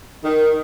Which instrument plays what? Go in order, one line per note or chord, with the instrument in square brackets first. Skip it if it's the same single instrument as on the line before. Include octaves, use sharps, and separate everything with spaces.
[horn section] D#3